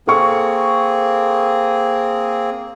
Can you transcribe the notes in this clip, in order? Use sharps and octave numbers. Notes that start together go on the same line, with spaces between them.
A#3 C4 G#4 A4 C#6